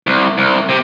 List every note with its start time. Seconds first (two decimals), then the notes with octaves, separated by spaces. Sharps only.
0.07 C2
0.38 C2
0.69 C3